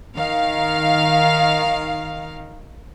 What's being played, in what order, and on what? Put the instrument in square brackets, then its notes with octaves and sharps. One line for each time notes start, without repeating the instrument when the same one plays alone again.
[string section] D#3 F5